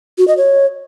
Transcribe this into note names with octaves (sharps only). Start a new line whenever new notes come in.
F#4
D#5
C#5